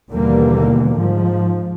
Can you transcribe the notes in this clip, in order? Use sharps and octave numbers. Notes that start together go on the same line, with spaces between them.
D#2 B2 D3 E3 G3 A#3
G#2 F3